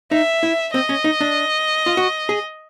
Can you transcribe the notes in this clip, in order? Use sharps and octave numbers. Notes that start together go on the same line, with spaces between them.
D#4 E5
E4
C4 D#5
C#4
D#4
D4
F4
F#4
G#4